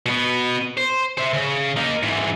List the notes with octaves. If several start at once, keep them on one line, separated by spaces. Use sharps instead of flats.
B2 B3
C5
C5 E5
C#3
A#3 D#4
G#2 E3